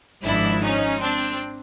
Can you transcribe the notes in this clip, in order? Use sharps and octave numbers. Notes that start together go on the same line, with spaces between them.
G#1 G#2 F3 D4 E4
C#4 D#4
C4 D4